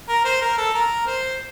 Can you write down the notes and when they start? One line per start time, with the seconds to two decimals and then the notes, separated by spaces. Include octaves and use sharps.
0.09 A#4
0.25 C5
0.42 A#4
0.58 A4
0.74 A#4
1.07 C5